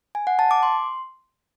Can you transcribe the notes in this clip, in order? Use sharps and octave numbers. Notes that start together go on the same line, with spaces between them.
G#5
F#5
A5
D6
C6